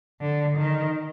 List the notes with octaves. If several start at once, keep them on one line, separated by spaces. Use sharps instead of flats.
D3
D#3